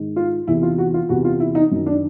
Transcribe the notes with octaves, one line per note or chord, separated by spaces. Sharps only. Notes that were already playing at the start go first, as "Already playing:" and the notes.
Already playing: G#2 D#3
F4
E2 C3 E3 E4
F4
F#4
F4
E2 C3 E3 F#4
F4
E4
D#4
F#2 D#3
D4